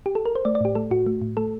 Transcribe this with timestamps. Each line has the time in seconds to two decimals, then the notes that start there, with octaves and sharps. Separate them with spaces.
0.06 G4
0.15 A4
0.26 A#4
0.36 C5
0.45 A3 D5
0.55 D5
0.61 A2 G4
0.75 A3 A4
0.91 A2 F#4
1.06 A3
1.22 A2
1.37 A3 A4